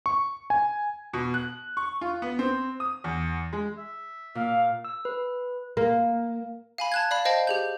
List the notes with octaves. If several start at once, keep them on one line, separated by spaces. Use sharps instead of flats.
C#6
G#5
B2
F#6
C#6
F4
B3
C4
D#6
E2
G#3
E5
A#2 F5
E6
B4
A#3
F5 G#5 B5
A5 F#6 G#6
D5 F5 B5
C5 D#5 F5 G5 A5
G4 G#4 G6